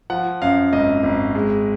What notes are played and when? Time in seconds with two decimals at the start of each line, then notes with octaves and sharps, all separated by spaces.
0.10 F3 F#5
0.42 F#2 F5
0.73 G#1 D#5
1.03 G#1
1.35 G#3